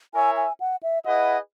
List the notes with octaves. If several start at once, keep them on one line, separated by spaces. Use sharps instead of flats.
E4 A#4 C#5 E5 G#5
G#5
F#5
E5
E4 G#4 B4 D#5 F#5